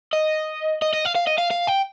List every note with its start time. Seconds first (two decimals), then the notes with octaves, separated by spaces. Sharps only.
0.13 D#5
0.82 D#5
0.93 D#5
1.05 F5
1.16 F5
1.27 D#5
1.38 F5
1.51 F5
1.68 G5